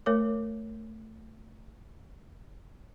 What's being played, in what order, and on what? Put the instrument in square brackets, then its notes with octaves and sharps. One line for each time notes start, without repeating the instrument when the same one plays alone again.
[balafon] A3 A#4 C#5 D6